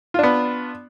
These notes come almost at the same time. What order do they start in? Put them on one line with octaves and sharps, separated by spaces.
F4 D4 B3